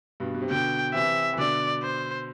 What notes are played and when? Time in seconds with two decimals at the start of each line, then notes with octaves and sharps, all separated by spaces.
0.20 G2 B2
0.34 B2
0.42 C3
0.50 B2 D3 G5
0.94 C3 E3 E5
1.33 E3
1.38 B2 D3 D5
1.83 C5